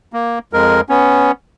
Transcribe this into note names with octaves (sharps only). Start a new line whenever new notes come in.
A#3
F2 G#3 A#4
B3 C#4